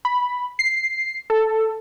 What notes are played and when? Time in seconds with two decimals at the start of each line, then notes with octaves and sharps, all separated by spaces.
0.05 B5
0.59 C7
1.30 A4